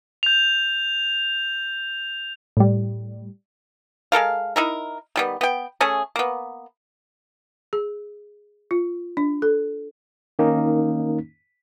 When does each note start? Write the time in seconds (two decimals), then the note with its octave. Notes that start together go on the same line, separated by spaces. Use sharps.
0.23 G6 F7
2.57 A2 G3
4.12 G#3 A4 A#4 F5
4.56 D#4 E4 A#4
5.16 D#3 G3 B3
5.41 B3 G5
5.81 A3 C#4 G#4
6.16 A#3 B3
7.73 G#4
8.71 F4
9.17 D4
9.42 A4
10.39 D#3 A#3 C#4 D#4